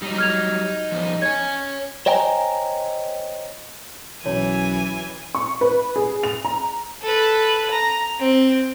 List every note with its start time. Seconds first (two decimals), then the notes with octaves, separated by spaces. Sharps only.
0.02 F#3 G3 D#4
0.18 F6 G#6 F7
0.92 F3 G3 B3
1.22 C#5 G#5 G#6
2.06 C5 C#5 D#5 G5 G#5 A#5
4.26 B1 F#2 E3 C#5 G#5
5.35 C#6
5.61 B4
5.96 G#4
6.23 F7
6.45 A#5
7.01 A4 B4
7.71 A#5
8.19 C4